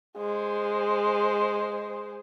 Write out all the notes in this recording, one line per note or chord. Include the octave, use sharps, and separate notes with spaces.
G#3 C5